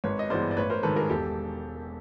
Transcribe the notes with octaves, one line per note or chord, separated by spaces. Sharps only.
G#1 B4 C#5
D#5
G2 E3 G#3 B3 C5 D5
D5
A1 B4 C#5
A#4 C5
G#2 D#3 A4 B4
G#4 A#4
E1 G4 A4